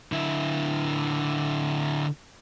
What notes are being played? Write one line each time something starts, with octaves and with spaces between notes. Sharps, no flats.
D3 E4